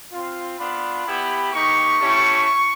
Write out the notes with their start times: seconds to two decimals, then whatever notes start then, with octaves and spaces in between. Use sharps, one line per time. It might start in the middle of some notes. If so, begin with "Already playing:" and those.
0.12 C4 F4
0.59 B3 D4 F4 B5
1.06 B3 E4 G4
1.53 A#3 D#4 G4 C#6
1.99 A3 C#4 E4 G4